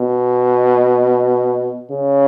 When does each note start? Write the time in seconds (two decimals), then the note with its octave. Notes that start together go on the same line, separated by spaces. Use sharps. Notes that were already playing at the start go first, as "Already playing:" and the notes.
Already playing: B2
1.91 C#3